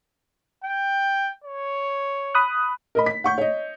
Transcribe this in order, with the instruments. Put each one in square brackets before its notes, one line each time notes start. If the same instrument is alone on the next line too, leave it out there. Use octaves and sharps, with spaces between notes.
[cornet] G5
C#5
[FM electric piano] B5 D#6 F#6
[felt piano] A#4 D#5 B5
B6
F#5 C#6 G6
C#5 D#5